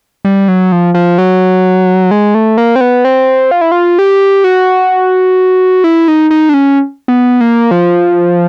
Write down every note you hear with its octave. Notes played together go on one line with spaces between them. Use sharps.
G3
F#3
F3
F3
F#3
G#3
A3
A#3
C4
B3
C4
F4
E4
F4
G4
F#4
E4
D#4
D#4
D4
C#4
B3
A#3
F3